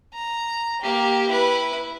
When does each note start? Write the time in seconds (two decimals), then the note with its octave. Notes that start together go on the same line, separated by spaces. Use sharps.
0.14 A#5
0.82 A#3 G4
1.28 E4 B4